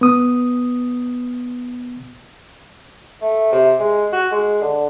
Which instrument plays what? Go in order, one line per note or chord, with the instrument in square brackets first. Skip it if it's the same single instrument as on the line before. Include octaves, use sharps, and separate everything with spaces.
[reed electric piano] B3 D#6
[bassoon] A3
C3
G#3
F#4
G#3
D3